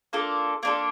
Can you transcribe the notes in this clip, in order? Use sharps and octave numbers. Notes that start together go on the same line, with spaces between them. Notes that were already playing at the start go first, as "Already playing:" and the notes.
A#3 D4 F4 A4
A#3 D4 F4 A4